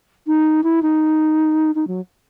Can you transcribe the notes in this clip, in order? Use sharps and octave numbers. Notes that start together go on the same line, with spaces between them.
D#4
E4
D#4
D#4
F#3